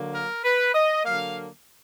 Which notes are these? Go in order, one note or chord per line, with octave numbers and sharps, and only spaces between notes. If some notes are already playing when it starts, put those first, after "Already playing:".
Already playing: D3 F#3 A#3
A#4
B4
D#5
D3 F#3 A#3 F5